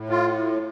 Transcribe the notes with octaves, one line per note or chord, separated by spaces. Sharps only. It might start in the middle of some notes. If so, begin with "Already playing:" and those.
Already playing: A2
F4